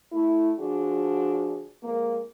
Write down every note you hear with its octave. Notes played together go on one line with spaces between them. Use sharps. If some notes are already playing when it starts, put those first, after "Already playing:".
A3 E4
D3 F3 D4 F#4 G#4
F2 G#3 A#3